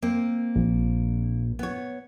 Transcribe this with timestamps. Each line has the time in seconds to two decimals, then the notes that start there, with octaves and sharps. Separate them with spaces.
0.02 A#3 C4
0.55 A#1
1.59 B3 C#5